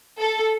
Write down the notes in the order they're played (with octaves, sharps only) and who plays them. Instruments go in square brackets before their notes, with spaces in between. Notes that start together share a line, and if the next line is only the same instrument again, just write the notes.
[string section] A4